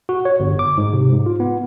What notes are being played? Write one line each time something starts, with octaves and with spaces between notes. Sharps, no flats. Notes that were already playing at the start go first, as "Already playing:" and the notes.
F#4
C#5
G1
D6
G#2
C3
G#2
F4
B3